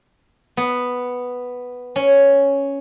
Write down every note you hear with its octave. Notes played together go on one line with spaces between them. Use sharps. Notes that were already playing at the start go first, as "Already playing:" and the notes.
B3
C#4